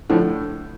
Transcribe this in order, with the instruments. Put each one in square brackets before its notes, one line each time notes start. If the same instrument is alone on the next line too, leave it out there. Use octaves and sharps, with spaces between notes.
[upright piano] A2 [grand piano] D3 F3